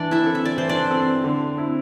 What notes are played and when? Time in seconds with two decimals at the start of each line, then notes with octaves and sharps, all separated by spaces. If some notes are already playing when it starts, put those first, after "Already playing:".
Already playing: E3 D4 D5
0.11 E4 E5
0.23 C4 A4
0.35 E5
0.45 D5
0.57 E3 C5
0.69 D4 D5
0.91 C4 A4
1.24 D3
1.58 C4 E4